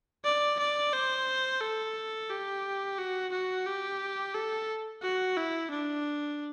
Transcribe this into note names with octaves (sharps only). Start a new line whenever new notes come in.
D5
D5
C5
A4
G4
F#4
F#4
G4
A4
F#4
E4
D4